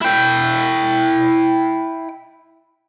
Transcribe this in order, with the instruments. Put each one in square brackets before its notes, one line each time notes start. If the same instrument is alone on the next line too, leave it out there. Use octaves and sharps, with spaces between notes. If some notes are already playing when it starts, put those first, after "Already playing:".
[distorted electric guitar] E4 G5